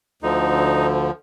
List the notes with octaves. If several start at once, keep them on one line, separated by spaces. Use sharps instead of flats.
D2 D3 F3 D#4